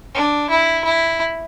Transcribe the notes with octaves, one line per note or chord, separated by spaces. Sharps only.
D4
E4
E4